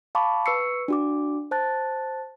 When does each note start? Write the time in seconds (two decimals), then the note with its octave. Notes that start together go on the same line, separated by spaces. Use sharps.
0.15 F5 A5 B5 C#6 D6
0.46 B4 C#6 E6 C7 C#7
0.88 D4 F#4 D6
1.51 C5 A5 F#6 A6